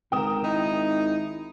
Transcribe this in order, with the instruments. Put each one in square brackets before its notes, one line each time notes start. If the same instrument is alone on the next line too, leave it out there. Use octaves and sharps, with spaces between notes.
[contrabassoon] G#1 [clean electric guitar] C#2 A#4 [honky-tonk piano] G5 D#6 E7
[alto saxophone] D#4 [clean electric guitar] E4